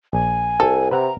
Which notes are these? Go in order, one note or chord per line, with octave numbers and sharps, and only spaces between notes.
A#1 G#5
C2 A4
C3 B4 E5 F#5 A#5